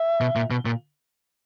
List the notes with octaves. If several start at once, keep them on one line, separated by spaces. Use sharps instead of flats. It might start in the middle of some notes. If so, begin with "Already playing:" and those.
Already playing: E5
B2
A#2
B2
A#2